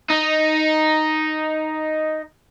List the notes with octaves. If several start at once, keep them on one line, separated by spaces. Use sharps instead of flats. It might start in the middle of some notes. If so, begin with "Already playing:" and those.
D#4